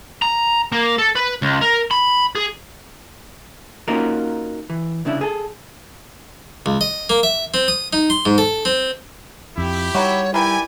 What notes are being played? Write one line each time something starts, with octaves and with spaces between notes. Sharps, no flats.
A#5
A#3
A4
B4
C#2
A#4
B5
G#4
A#3 C#4 D#4 F4 F#4 A#4
E3
C2 C#3 D4 E4
G#4 A4
C#2
D#5
A#3
E5
C4
D#6
D#4
C6
G#2
A4
C4
F2 E4 G4
G3 B3 D#4 F#4 C#5
D#3 E4 G4 B4 D5 G5 G#5